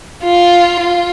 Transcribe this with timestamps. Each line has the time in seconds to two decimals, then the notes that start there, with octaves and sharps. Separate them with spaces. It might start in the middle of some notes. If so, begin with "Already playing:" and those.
0.23 F4
0.80 F4